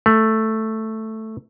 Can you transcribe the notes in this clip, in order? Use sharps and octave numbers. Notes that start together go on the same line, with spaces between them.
A3